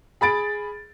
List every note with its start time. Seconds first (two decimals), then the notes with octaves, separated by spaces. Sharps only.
0.21 G#4 B5 A6 D7